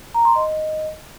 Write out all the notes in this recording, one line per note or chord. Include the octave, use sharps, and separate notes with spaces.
A#5
C6
D#5